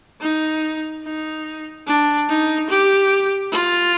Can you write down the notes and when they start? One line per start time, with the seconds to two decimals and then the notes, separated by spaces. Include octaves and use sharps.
0.21 D#4
1.04 D#4
1.87 D4
2.28 D#4
2.70 G4
3.52 F4